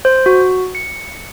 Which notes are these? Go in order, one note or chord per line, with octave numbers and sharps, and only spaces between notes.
C5
F#4
C#7